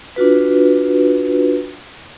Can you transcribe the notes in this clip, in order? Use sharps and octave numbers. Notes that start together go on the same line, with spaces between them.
D4 F4 F#4 B4